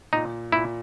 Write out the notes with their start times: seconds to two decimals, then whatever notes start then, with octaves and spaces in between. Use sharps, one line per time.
0.13 A#2 D#4
0.52 A#2 E4